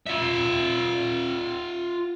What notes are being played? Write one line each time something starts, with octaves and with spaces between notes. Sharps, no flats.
F4 E5